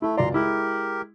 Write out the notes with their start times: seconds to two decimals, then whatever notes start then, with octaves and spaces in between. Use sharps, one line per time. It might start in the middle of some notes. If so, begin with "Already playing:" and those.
0.02 A3 E4
0.17 C#2 F#2 D5 A#5 C6
0.34 G#3 E4 G4 A#4